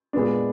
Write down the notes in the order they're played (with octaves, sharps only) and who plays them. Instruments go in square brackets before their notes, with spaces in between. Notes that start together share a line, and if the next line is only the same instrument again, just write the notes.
[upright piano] A#2 G#3 B3 D4